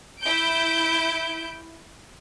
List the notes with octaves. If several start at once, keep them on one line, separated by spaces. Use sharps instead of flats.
E4 G6 D7